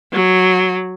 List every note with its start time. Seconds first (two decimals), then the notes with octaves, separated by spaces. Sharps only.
0.13 F#3